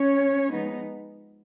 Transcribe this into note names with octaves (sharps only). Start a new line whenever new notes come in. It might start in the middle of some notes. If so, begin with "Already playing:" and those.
Already playing: C#4 C#5
F3 G#3 B3 D#4